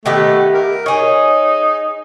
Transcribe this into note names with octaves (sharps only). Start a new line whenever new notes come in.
D#3 A3 B3 G4
A#4
D#4 G#4 C#5